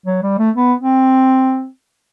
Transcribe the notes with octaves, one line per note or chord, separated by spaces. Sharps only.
F#3
G3
A3
B3
C4